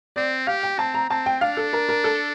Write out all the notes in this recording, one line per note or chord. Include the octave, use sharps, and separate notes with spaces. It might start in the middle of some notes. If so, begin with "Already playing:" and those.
C4 D5
G4 F5
G5
C4 A5
A#5
C4 A5
G5
D4 F5
A4
A#4
A#4
A4